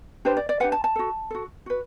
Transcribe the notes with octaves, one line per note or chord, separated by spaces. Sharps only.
D4 G4 B4 C5
D5
D5
D4 G4 B4 F#5
A5
A5
F#4 A4
F#4 A4
F#4 B4